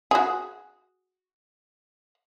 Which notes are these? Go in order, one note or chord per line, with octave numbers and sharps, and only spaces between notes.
F#4 G#4